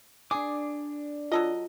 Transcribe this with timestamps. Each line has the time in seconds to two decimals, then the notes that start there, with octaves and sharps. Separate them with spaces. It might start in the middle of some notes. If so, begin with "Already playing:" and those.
0.31 D4 G#4 D6
1.32 F#3 F4 A4 D#5